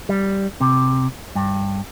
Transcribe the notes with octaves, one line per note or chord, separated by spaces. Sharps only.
G3
C3
G2